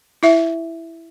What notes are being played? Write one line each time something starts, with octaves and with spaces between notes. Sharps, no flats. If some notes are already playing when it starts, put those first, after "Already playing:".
E4 E5